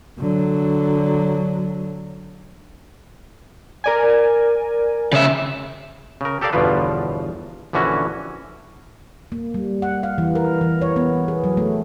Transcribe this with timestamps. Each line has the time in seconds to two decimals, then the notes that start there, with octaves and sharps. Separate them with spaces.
0.19 D3 F#3
3.84 A#4 D5 G#5
5.13 C#3 E5
6.21 C#3 A#4
6.41 G4 A4 A#4 D5 F5
6.53 G1 E2 B2 F3 F4 B4
7.73 A#1 D3 E3 C#4 F#4
9.32 A#3
9.54 G3
9.82 F#5
10.03 F5
10.18 E3
10.35 A#4
10.61 E3
10.81 C#5
10.96 B3
11.28 G#4
11.44 F#3
11.57 A3